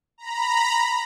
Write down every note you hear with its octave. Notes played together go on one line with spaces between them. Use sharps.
A#5 B5